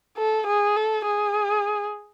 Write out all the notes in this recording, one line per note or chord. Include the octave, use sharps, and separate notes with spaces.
A4
G#4
A4
G#4